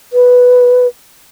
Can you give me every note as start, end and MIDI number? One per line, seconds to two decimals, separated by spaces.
0.13 0.87 71